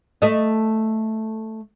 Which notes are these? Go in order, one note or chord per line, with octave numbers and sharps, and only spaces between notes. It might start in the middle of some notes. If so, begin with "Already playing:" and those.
A3 D#5